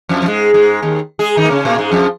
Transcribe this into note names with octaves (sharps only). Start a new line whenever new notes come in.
F2 F3
F3
G#2 G#3
G#2 G#3
D#2 D#3
G#3 G#4
D#3 D#4
A#3
C#3 C#4
A#2 A#3
G#2 G#3
F2 F3